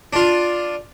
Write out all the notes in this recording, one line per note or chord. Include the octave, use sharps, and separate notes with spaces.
D4 F4